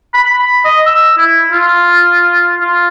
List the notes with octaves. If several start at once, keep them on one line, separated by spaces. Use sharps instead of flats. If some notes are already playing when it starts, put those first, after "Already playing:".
B5
D#5
E6
E4
F4
F4